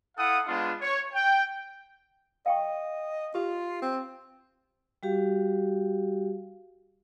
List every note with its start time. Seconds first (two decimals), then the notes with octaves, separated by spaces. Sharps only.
0.17 E4 A4 F5 F#5 D#6
0.47 G#3 B3 D4 F4
0.81 C#5
1.14 G5
2.46 D#5 F5 G5 C#6
3.35 F4 G4
3.82 C4
5.03 G3 F#4 G4 F5